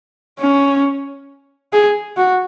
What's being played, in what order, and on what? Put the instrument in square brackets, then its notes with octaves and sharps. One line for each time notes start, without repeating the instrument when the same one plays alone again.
[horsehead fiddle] C#4
G#4
F#4